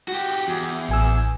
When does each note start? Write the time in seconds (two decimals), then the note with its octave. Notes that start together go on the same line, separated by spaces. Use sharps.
0.08 F#4 G4
0.48 E2
0.89 A1 G#5 E6